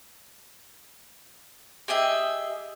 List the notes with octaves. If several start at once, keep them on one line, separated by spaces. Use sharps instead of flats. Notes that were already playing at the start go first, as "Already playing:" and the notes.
G4 G#4 D#5 E5